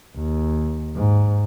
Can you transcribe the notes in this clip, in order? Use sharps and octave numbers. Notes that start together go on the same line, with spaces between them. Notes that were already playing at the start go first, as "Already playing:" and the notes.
D#2
G#2